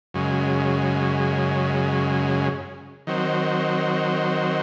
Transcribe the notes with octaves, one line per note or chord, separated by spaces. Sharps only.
F#2 C#3 G#3
D#3 F#3 C4